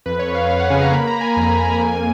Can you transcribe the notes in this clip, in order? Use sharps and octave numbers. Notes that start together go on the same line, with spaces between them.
F2 B4
C#5
F2
F5
F2 F5
F#5
C#3 G#5
A#5
A#3 B5
A#5
A#3
G#5
F2
F2
A#3